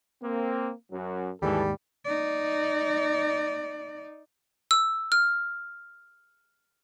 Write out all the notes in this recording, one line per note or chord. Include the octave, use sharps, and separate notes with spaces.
A#3 C4
F#2 F#3
D#2 G#2 E3 G3 G#4 A4
D#4 D5
E6
F6